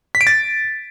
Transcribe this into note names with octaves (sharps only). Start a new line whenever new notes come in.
B6
D7
A6